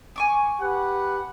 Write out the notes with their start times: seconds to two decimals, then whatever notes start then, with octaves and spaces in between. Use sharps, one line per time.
0.16 G#5 C#6 D6
0.61 G4 B4 F#5